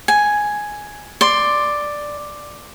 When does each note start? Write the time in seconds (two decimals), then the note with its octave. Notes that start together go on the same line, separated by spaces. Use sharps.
0.08 G#5
1.21 D5 C6